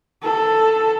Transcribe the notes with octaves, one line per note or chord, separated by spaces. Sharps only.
A4